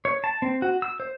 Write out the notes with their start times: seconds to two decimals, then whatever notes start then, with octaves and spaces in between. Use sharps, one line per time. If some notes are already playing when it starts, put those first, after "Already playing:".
0.05 C#5
0.24 A5
0.42 C4
0.62 F#4
0.82 E6
1.00 C5